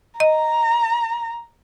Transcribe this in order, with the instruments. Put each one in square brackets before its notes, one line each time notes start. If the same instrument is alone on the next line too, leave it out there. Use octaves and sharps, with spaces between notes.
[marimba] D#5 [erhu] A#5